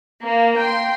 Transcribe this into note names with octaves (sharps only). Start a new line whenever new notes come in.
A#3
G5 C6